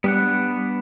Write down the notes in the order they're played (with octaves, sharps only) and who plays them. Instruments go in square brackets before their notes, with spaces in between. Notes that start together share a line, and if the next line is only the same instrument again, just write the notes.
[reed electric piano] G3 [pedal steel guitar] B3 D4 F#5